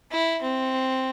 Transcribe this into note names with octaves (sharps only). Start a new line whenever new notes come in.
E4
C4